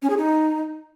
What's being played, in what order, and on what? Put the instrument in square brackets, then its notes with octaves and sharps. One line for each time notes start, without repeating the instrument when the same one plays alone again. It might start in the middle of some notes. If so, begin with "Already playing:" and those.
[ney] C#4
G#4
D#4